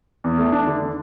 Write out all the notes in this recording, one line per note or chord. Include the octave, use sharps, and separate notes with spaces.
E2
A3
D4
D3